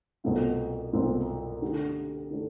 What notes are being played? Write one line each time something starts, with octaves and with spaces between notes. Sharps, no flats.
C2 B2 A3 C4 F4
C2 B2 A3 C4 F4
D3 A3 D4 G4
D3 A3 D4